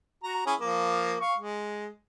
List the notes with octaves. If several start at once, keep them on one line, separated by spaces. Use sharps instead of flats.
F#4 A#5
C#4 E4 G#4
F3 A#3
F5 C#6
G#3